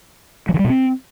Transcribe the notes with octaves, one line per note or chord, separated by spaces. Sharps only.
F#3
D#3
G3
B2
C4